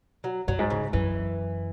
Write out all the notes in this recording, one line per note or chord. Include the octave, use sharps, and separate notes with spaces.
F#3
F#2 F#3
G#2
C#3
F#2 E3